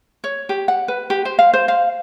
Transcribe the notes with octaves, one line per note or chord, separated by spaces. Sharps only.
C#5
G4
F#5
B4
G4
C5
F5
C5
F5